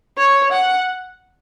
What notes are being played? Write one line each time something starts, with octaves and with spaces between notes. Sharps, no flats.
C#5
F#5